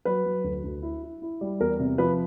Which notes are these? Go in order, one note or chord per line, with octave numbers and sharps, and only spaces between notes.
F#3 B4
F#3
D2
D2
E4
E4
E4
G3
E2 A#4
C3
F3 B4